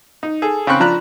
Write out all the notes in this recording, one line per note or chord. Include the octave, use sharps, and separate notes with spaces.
D#4
G#4 A4
C#3 C4 G5 B5 C#6 F#6
F3 D4 A#5 B5 F#6